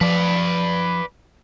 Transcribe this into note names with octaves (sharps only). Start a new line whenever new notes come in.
F3 B4 D5